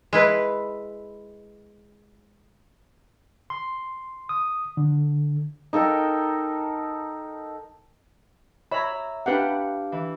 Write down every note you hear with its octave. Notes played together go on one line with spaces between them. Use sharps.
G#3 E4 B4
C6
D#6
D3
D#4 A4 A#4 G5
C#5 E5 A#5 B5
D4 G4 B4 F5 F#5
E3